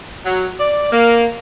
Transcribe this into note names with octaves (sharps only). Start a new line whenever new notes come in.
F#3
D5
A#3